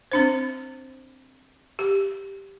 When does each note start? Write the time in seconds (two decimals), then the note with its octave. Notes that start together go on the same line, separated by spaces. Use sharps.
0.12 C4 D4 C5
1.79 G4